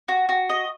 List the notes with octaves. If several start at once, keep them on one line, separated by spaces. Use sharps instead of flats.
F#4
F#4
D#5